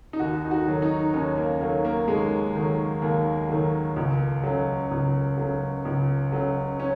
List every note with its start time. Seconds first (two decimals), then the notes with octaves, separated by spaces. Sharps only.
0.13 D#4
0.19 D#2 F#4
0.45 D#4
0.51 F#4
0.67 D#3 F#3
0.82 D#4
1.13 D#2 C#4
1.37 A#3
1.61 D#3 F#3 A#3
1.85 A#3
2.08 D#2 G#3
2.55 D#3 F#3
3.02 D#2 A#3
3.49 D#3 F#3
3.96 C#2
4.43 C#3 F#3
4.91 C#2
5.38 C#3 F#3
5.85 C#2
6.32 C#3 F#3
6.80 C#4